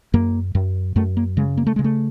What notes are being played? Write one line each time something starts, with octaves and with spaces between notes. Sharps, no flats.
F#2 A#3
F#2
F#2 A3
A#3
C#3 G#3
A#3
A3
C#3 G#3
A3